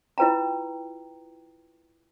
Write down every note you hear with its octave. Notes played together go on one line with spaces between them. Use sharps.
E4 F4 B4 G5 A#5